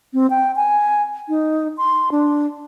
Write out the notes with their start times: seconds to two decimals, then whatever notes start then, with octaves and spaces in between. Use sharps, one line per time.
0.14 C4
0.30 G5
0.56 G#5
1.29 D#4
1.78 C6
2.12 D4